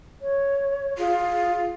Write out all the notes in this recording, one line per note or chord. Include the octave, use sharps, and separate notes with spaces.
C#5
F4 G#4